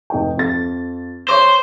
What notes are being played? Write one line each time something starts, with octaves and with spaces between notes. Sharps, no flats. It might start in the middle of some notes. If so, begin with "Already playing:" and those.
F1 D#4 G5
F2 A6
C5 C#5 C#6 D6